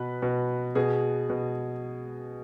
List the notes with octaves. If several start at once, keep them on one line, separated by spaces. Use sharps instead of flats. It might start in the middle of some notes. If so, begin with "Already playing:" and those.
Already playing: B2 B4
B2
B2 G#4
B2